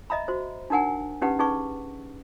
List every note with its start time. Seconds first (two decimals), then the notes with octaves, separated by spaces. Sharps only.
0.10 D#5 E5 A#5 B5
0.28 F#4 C5
0.70 D4 D#4 A#4 F#5 G#5
1.22 C#4 D#4 G4 B4 F#5
1.39 C#4 D#4 G#4 B4 C#6